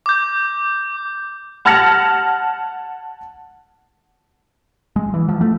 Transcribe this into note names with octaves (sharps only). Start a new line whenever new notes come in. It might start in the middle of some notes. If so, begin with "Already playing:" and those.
D6 G6
F#5 A5 F6 G#6 A#6 C#7
G#3
E3
F3
A3